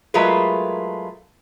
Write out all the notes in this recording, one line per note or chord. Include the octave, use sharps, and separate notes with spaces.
F#3 G#3 A3 F4 A#4 B4